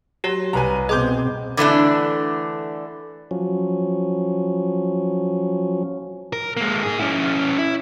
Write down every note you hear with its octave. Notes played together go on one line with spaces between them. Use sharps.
F#3 G4 C#5
C2 B4 G#5 A#5
B2 C4 G#4 D#5 C6 D6 G6
D3 E3 A3 D4
F3 F#3 C#4
A#4
G#3 A#3
D#4 G#4
C#4 E4
E4